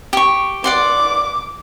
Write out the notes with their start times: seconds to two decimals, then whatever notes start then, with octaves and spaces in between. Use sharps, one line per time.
0.13 G4 C#6
0.64 D5 F#5 C6 D6